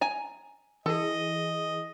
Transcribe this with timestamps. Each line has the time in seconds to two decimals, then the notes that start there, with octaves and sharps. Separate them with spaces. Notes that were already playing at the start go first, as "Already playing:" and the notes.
0.01 G#5 A#5
0.86 E3 G#4 A4 D#5